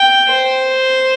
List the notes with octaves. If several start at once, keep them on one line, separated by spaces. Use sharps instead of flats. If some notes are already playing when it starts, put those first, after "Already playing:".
Already playing: G5
C5